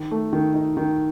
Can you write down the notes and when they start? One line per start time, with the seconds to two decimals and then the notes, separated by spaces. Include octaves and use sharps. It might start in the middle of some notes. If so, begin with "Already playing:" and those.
Already playing: D#3
0.11 A3
0.33 D#3
0.54 D#4
0.77 D#3